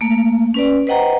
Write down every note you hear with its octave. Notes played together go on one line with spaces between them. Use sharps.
A3 A#3
C#4 B4 D5
B4 C5 D#5 F#5 G5 A#5